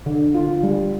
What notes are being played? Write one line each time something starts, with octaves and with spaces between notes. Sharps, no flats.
D3
F4
G3